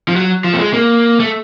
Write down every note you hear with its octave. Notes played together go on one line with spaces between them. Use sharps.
F3
F#3
F3
A3
G#3
A#3
A3